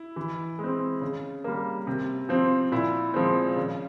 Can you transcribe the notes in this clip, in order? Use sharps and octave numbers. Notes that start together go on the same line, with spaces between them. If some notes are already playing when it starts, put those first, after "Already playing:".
Already playing: E4
E3
G#3
C4
C#3
G3 A#3
C3
F3 C4
A#2 E4
F3 G#3 C4
C#3